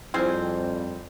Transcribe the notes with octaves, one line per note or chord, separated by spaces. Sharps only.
F2 G3 C4 E4 F4 G#4 C5 G#5